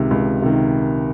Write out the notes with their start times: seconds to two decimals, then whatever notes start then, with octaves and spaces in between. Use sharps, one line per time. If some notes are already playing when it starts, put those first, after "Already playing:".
Already playing: C#2 C3 D#3
0.11 C#2
0.42 C3 D#3